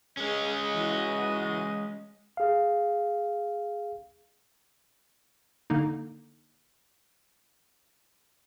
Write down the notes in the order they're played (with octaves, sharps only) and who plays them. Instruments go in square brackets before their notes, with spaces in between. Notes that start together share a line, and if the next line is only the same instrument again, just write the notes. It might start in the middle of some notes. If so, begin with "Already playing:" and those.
[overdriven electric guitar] G#3 C#4 [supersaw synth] G#4 [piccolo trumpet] D#5
[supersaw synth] E3 F#4 D#7
[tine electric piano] G#4 F5
[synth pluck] D3 A#3 D#4